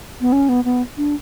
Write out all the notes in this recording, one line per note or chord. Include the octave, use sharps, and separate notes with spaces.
B3
C#4
B3
B3
D4